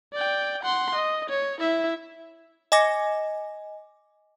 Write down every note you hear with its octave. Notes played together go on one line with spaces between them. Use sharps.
D5 G5
F#5 C6
D#5
C#5
E4 E5
D#5 G#5 D6 A#6